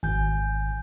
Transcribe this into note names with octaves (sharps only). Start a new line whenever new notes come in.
G#1 G#5 G6